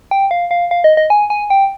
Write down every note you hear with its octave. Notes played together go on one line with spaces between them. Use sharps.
G5
F5
F5
F5
D#5
D#5
G#5
G#5
G5